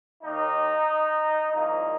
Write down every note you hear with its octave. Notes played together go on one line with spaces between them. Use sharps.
D#2 D#3 A#3 D#4
C2 A#2 F3 A#3 D#4